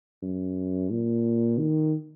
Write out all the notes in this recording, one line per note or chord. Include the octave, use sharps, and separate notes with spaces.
F#2
A#2
D#3